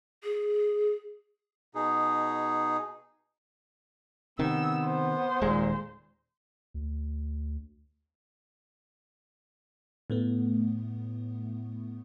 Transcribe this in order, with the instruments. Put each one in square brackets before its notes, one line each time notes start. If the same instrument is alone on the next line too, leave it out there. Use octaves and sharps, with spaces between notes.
[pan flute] G#4
[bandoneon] B2 D#4 G#4
[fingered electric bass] C3 D#3 [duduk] B3 [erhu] E6
[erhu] C5
[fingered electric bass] D#1 G#3 [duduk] A#2
[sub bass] D2
[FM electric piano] A2 A3 B3